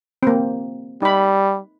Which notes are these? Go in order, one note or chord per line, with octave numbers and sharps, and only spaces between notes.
A#3 C4
G3 D#4 B5